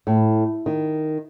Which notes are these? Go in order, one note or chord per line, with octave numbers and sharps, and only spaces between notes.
A2
D#3